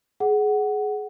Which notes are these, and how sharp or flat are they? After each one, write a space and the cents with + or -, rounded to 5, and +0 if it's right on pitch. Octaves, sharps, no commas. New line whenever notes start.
G#4 +20 F#5 +10